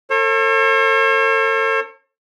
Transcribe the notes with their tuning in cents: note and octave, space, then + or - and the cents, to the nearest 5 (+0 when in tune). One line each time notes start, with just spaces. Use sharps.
A4 +35 C#5 -45